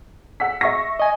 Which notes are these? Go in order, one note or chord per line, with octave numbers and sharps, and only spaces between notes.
F#5 E6 B6
E5 C#6 A#6
D#5 G#5